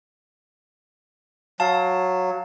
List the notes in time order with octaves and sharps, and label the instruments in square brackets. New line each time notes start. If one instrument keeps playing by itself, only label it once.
[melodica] F#3 [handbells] F5 A5